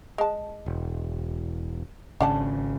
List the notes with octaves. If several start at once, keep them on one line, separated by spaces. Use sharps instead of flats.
G#3 A5
E1
G#1 C#3 D4 F#5 A5